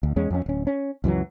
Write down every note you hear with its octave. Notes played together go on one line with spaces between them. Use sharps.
D2
E2 G#3 C#4
F2 C#4
D1 C#4
C#4
C#2 F#2 E3 F#3